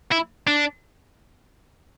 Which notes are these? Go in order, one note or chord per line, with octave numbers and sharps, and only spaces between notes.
E4
D4